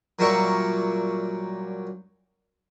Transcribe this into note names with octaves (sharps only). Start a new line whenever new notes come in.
A#2 F#3 G3 A#4 E5 C#6